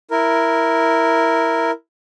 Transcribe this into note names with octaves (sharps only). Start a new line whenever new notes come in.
E4 A#4